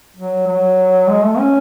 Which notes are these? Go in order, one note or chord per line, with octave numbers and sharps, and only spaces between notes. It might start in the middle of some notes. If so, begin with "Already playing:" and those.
F#3
F#3
G#3
A3
C#4